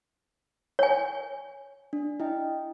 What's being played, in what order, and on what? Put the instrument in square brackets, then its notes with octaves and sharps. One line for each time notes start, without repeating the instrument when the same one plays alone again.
[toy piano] C#5 G#5
[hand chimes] D4
E4 D#5 G5